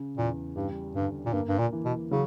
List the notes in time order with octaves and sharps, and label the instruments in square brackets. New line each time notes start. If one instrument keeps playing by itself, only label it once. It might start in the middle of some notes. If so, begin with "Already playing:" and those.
Already playing: [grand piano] C#3
[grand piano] E2 [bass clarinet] A#2
[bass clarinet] G2 [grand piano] G3
[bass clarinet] G2 [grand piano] D3
[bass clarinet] A#2
[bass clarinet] G2 [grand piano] A#3
[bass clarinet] G2
A#2
[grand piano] E3
[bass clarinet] B2
[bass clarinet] C#3 [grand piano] F#3